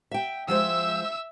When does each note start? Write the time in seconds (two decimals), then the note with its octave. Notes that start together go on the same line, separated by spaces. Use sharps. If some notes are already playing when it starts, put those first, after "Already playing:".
0.11 E5 G5
0.48 F3 G#3 C5 E5 E6